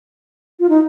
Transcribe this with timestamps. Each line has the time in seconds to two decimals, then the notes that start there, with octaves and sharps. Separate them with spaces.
0.60 F4
0.69 D#4